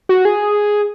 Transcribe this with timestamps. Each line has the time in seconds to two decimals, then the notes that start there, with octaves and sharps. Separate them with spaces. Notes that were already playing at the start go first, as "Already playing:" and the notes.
0.09 F#4
0.25 G#4